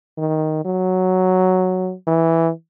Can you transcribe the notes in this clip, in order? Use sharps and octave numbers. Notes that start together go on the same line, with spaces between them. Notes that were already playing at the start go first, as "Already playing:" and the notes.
D#3
F#3
E3